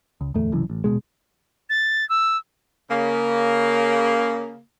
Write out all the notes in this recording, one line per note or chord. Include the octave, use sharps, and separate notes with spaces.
C#2
D1 E2 A3
F#1 C2 F#2 E3
A1
D#1 G#1 B2 G#3
A6
E6
C#3 A#3